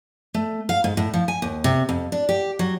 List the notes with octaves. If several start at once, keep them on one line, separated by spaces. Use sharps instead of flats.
A3
F5
G#2
A2
F3
G#5
D#2
C3
F2
D4
G4
F#3